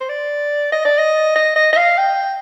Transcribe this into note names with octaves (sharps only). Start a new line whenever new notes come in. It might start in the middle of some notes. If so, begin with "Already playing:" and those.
C5
D5
D#5
D5
D#5
D#5
D#5
D#5
F5
G5